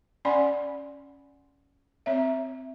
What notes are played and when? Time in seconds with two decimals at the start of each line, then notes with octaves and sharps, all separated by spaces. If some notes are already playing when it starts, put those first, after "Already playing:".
0.25 C#4 D5 F#5 G#5 C6
2.06 C4 C#5 E5